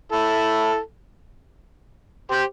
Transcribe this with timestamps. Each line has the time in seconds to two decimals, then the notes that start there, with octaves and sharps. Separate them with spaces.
0.12 E4 A4
2.31 G4 C5